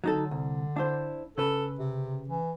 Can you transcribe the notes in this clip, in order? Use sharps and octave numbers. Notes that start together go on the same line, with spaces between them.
D3 F#3 D#4 A4
C2
D4 E4 C5
C#3 A4 B4
C3
E3